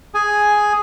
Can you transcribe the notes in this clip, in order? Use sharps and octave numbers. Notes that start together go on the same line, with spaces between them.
G#4 G#5